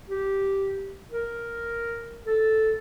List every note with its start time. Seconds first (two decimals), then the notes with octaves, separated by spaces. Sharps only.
0.08 G4
1.11 A#4
2.27 A4